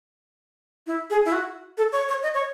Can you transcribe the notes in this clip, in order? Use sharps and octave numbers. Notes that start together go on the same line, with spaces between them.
E4
G#4
E4
F#4
A4
C#5
C#5
D#5
C#5